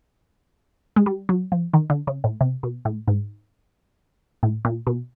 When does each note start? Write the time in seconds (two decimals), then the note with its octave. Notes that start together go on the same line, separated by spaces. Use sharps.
0.96 G#3
1.06 G3
1.29 F#3
1.52 F3
1.73 D#3
1.90 D3
2.07 C#3
2.24 A2
2.41 C3
2.63 B2
2.85 A2
3.08 G#2
4.43 A2
4.65 A#2
4.87 B2